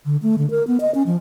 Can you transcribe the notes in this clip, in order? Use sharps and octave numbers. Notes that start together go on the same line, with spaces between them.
D3
A3
D3
A#4
B3
D#5
C#4
F3